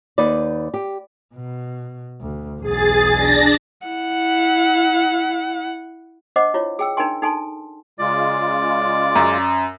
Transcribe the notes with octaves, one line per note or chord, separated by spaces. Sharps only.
D#2 D#4 B4 D5
G4
B2
D2
B1 E2 G#4 A6
D4 A6 A#6
E4 F#5
D4 C5 D#5 F#5 D6
E4 F4 C#5
G#4 G5 E6
D4 D#4 A#4 G5 G#5 C6
D#4 A4 G#5 A5 C6
C#3 G#3 F4 D5
F#2